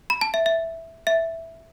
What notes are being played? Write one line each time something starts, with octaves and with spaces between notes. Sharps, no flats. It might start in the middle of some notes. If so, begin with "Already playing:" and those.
B5
A5
E5
E5
E5